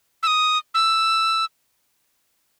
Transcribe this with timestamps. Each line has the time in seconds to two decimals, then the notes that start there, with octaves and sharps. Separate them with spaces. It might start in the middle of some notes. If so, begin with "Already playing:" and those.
0.23 E6
0.27 D#6
0.74 E6